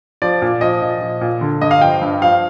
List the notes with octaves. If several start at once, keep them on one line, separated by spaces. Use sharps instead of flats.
F3 D5
A#2
F3 D#5
A#2
F3
A#2
D3
G2 D#5
F5
F3 G5
G2
F3 F5